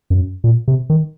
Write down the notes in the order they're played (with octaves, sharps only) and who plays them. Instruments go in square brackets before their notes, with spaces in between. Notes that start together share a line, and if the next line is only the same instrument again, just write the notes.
[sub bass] F#2
A#2
C3
D#3